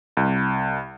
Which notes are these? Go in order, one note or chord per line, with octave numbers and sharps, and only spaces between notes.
C2